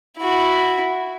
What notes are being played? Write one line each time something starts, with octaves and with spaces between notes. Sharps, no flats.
E4 F#4